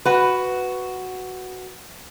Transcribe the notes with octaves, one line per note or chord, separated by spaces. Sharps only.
F#4 B4